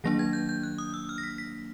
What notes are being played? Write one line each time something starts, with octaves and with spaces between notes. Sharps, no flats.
D#3 F#3 A#3 D4 A#6
G#6
G6
G6
F#6
D#6
E6
F6
A#6
B6
B6